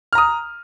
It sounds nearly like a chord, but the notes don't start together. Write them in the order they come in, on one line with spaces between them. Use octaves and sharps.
F6 A#5 D#6